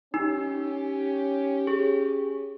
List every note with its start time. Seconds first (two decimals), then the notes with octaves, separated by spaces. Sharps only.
0.14 C#4 D#4 G4
1.67 G#4